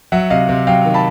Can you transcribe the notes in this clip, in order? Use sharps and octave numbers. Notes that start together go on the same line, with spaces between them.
F#3 E5 F#5
C3 D#5 F5
C3
F#3 F5 G5
D#3
A5 B5